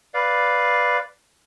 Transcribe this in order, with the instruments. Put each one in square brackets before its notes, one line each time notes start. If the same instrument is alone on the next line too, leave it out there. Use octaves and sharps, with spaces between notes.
[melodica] B4 D5 F5